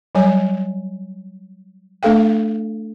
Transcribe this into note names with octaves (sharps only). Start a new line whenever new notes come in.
F#3 G3 C#5 G#5
A3 D4 A4 F5 G5